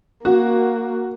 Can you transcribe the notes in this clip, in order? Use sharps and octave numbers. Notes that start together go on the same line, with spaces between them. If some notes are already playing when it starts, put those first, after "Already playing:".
A#3 F#4